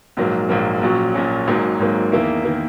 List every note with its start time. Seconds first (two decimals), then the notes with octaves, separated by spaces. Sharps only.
0.17 A#1 G#2 F#3 A#3
0.49 A#1 G#2 F#3 A#3
0.81 A#1 A#2 F#3 C#4
1.14 A#1 A#2 F#3 C#4
1.48 G#1 G#2 F#3 A#3
1.79 G#1 G#2 F#3 A#3
2.12 E2 D#3 A#3 E4
2.45 D#3 A#3 E4